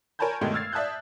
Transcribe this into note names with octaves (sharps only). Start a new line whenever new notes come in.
A#4 C#5 G#5 A5 B5 G6
G2 B2 D#3 G#3 A3
E6 F6 G#6 A6 C7
D5 E5 A5 D#6 F#6 G6